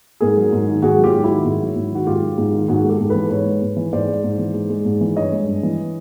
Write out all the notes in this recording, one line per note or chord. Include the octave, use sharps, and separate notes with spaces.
G#2 G#4 A#4
F#3
G#2
D#3
G#2 F#4 G#4
F#3
F4 G4
G#2
E4 F#4
D#3
G#2
F#3
G#2
D#3 F#4
G#2 F4 G4
F#3
G#2
D#3
G#2 F#4 G#4
G#3
G4 A4
G#2
E3 A4 B4
G#2 B4 C#5
G#3
G#2
E3
G#2 C5 D5
G#3
G#2
E3
G#2
G#3
G#2
E3
G2 C#5 D#5
G#3
G2
E3